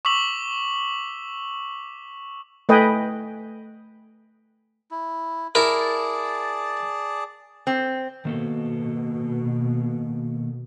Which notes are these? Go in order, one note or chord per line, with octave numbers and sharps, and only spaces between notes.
C#6 D6 E6 B6 F#7
A3 B4 D#5 G5 G#5
E4
E4 G#4 A#4 D5 A5
C4
B2 D#3 A#3 A4